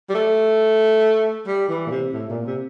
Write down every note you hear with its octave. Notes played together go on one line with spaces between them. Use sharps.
G3
A3
G3
E3
A#2
C3
A2
A#2
C3